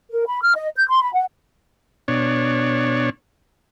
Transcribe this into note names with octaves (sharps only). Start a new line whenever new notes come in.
A#4
B5
F6
D#5
G6
C6
B5
F#5
B2 D4 C#5